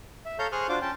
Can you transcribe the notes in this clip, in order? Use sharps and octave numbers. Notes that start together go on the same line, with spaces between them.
E5
A4 C#5 F5 A#5 G6
G#4 C5 C#6 D#6 F6 F#6
D4 F4 F#4 C5 D6
C#4 G5 A5